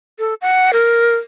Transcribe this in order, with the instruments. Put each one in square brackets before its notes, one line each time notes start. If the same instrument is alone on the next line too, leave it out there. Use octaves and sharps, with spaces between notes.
[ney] A4
F#5
A#4